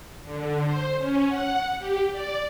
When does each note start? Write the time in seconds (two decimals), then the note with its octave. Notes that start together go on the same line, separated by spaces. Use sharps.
0.24 D3
0.64 C5
0.98 C#4
1.28 F#5
1.78 G4
2.11 D5